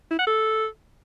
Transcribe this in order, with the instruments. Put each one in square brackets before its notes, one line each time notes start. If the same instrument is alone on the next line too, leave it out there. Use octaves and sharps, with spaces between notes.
[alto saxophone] E4
F#5
A4